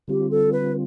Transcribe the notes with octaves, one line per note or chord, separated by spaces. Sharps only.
D3 G3 C4 F4 G4
A4
B4